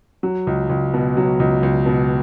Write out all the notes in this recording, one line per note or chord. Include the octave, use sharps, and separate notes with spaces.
F#3
C#2
C#2
B2
F#3
C#2
C#2
B2